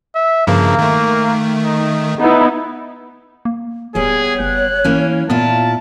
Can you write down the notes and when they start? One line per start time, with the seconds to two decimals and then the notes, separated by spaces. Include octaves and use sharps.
0.15 E5
0.47 G2 C#3 F3 A#3
0.79 D#3 A3
1.64 D#4
2.19 B3 D#4 E4
3.45 A#3
3.95 D1 G3 B3 G#4 C#5
4.40 F#1 F#6
4.84 E3 A#3 C#4
5.30 A#2 B3 E4 F4 A5